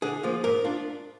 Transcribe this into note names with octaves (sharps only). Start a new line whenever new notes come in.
D3 G#4
F3 A#3 F4
G#2 A#4
D4 F4